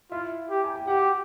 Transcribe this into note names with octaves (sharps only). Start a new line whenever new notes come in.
E4 F4 E5
G4
G#5
G5
F#4 G4 F#5